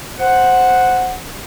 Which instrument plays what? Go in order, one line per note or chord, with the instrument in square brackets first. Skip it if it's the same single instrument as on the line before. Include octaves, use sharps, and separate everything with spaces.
[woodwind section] C5 F#5